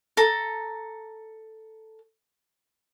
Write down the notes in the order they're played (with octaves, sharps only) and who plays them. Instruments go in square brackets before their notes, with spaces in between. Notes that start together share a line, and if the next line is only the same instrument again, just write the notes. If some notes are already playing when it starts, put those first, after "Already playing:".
[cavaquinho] A4 A#5